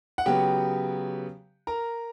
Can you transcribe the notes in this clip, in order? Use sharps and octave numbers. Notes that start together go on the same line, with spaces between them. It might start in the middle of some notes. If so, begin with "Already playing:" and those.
F#5
C#3 F#3 B3 G4 G5
A#4 A#5